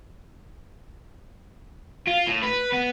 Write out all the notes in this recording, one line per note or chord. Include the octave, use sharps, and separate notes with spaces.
F4
A2
B4
B3